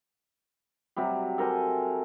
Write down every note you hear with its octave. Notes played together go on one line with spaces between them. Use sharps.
C3 F#3 G3
A4 A#4 C5 G#5